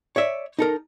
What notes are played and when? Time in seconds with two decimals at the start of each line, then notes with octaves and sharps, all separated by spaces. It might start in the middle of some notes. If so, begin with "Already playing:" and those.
0.16 C#5 D5 E5
0.59 D#4 A4 A#4